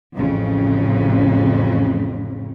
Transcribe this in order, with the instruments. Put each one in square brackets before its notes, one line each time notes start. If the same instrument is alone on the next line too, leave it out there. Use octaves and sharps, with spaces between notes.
[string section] A1 F2 C#3